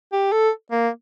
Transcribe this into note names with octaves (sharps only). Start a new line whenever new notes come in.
G4
A4
A#3